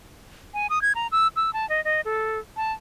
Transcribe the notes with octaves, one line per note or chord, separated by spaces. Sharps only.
G#5
D#6
G#6
A#5
E6
E6
A5
D#5
D#5
A4
A5